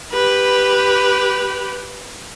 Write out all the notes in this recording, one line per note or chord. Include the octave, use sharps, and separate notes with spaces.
G4 B4